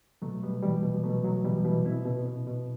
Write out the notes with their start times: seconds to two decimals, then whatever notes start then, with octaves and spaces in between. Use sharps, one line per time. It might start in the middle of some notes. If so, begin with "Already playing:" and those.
0.22 B2 F#3 A3
0.43 B2 G3 B3
0.63 B2 E3 G3
0.83 B2
1.03 B2 F#3 A3
1.24 B2 F#3
1.44 B2 E3 G3
1.65 B2 E3 G3
1.85 B2 C4 E4
2.05 B2
2.26 B2
2.47 B2